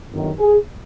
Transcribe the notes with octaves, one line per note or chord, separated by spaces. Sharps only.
G1 F#2 D#3
G#4